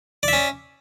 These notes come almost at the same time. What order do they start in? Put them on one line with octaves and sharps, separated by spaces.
D5 E5 C#4